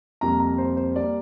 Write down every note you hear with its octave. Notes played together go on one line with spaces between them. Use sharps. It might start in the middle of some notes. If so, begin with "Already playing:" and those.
F2 C3 G3 A#3 A#5
A#5
C5
C5
G3 A#3 D5